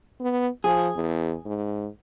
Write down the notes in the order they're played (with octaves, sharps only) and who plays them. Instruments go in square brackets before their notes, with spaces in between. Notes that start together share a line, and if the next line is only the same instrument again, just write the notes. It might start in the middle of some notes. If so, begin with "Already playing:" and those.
[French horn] B3
[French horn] F3 [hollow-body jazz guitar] G#4
[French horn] E2
G#2